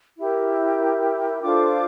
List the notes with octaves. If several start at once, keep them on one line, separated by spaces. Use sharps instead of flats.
E4 G4 A#4
D4 F4 A4 C5 D6